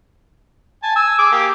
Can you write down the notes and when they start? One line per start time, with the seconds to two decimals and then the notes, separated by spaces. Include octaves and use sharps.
0.83 G#5 A5
0.96 G#5 E6
1.19 G#4 D6
1.32 A#3 G4